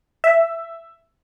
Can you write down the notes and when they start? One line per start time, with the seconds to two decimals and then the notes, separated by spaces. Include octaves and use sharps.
0.24 E5